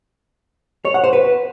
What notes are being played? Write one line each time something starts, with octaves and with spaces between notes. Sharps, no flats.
C#5
F#5
C5
B4